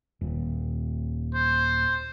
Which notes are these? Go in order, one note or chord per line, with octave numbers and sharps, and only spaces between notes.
D#1
C5